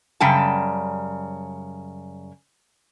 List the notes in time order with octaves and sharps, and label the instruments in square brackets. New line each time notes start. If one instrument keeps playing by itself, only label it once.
[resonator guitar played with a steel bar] F#2 C#3 G3 G5 A5